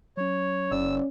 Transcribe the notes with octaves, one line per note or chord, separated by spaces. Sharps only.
F#3 C#4 C#5
F#1 C#4 D5 E6